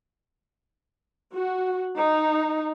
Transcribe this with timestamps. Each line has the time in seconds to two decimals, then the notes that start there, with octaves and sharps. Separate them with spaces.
1.33 F#4
1.96 D#4